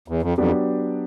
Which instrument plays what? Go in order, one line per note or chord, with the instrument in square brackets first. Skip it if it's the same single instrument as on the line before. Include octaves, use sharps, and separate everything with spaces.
[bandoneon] E2
F2
[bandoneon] F2 [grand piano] F#3 B3 D4 G4